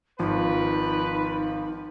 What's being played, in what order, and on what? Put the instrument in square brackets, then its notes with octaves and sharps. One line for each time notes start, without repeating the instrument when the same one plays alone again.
[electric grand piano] G#1 F3 [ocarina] D#4 [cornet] B4